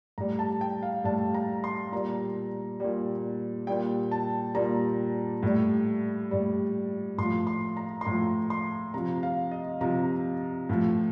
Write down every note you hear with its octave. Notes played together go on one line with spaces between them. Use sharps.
A2 G3 A#5
A5
G5
F5
A2 G3 A5
A#5
C6
A#2 G3 A#5
A#2 G3
A#2 G3 G5
A5
A#2 G3 A#5
A2 G3
A2 G3
A2 F3 C6
C6
A#5
C6
A2 F3 A#5
C6
C3 F3 A#5
F5
D#5
C3 F3 A#5
A2 F3